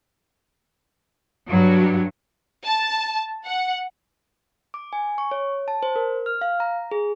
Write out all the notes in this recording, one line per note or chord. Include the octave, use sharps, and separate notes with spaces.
G2 F#3
A5
F#5
D6
G#5
C#6
C#5
A5
C5
A#4
F6
F5
A#5
G#4